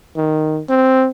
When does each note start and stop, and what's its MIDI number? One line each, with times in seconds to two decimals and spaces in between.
0.16 0.61 51
0.70 1.08 60